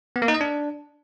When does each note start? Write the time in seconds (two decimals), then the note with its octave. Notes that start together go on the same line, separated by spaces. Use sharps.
0.16 B3
0.22 A#3
0.28 D#4
0.34 D#5
0.41 D4